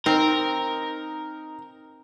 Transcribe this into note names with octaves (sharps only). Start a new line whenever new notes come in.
C4 D#4 A#4